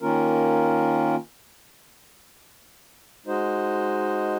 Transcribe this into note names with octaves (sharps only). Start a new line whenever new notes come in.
D#3 A#3 C#4 F4 A#4
G#3 D#4 F#4 C5 D#5